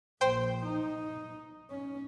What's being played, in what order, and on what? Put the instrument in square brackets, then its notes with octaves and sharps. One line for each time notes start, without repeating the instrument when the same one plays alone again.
[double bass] A#1 [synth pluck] C5 G5
[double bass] D#4
C#4